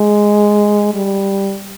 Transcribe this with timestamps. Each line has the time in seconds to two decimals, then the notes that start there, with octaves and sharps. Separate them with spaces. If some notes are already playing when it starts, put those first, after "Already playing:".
Already playing: G#3
0.94 G3